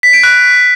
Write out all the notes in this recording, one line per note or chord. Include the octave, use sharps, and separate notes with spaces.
B6
D7
F#6